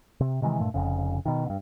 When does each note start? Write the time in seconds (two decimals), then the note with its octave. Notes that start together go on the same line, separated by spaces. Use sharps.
0.20 C3
0.42 C3 D#3 E3 G#3
0.59 G2 A#2 A3
0.74 F1 F2 C#3
1.26 B2 D#3
1.46 G2 D3